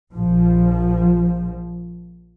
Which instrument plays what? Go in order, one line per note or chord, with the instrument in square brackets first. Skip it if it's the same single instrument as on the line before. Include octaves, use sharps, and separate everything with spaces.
[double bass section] A#1 F3